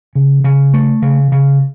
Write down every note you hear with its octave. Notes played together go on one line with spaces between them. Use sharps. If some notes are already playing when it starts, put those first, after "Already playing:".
C#3
C#3
A3
C#3
C#3